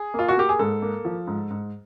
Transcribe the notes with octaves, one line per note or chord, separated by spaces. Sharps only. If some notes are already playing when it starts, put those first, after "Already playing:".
Already playing: G#4
A#3 F4
F#4
A#3 G4
G#4
G#2 A4
A#3
F3
G#2
G#2